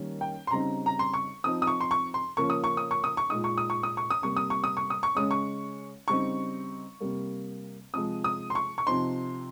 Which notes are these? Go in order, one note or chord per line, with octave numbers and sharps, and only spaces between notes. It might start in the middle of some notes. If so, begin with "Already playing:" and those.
Already playing: D#3 G3 A#3 C#4
G5
C6
C#3 G3 C4 D#4 A#5
A#5
C6
C#6
F3 C4 D#4 D#6
D#6
C#6
C6
C#6
C6
C#3 F3 A#3 C#4 C#6
D#6
C#6
D#6
C#6
D#6
C#6
A#2 G#3 D#4 D#6
C#6
D#6
C#6
D#6
C#6
D#6
C3 G3 A#3 C#6
D#6
C#6
D#6
C#6
D#6
C#6
C#3 G#3 C#4 D#6
C#6
C#3 G3 C4 D#4 C#6
C3 G3 A#3
C3 F3 G#3 D#6
D#6
C6
C#6
C#6
C3 F3 C4 D#4 C6